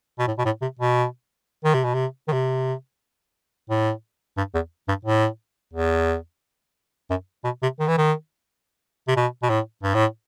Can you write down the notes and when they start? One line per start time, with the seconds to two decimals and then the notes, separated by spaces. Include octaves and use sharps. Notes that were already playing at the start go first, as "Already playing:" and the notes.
0.19 B2
0.27 A2
0.38 B2
0.45 A2
0.62 C3
0.79 B2
1.64 D#3
1.74 C3
1.84 B2
1.94 C3
2.28 D#3
2.33 C3
3.70 A2
4.37 G2
4.54 E2
4.88 G2
5.05 A2
5.74 E2
7.10 F#2
7.44 B2
7.62 C3
7.79 D#3
7.88 E3
7.97 D#3
9.08 C3
9.16 B2
9.42 B2
9.50 A2
9.83 G2
9.94 A2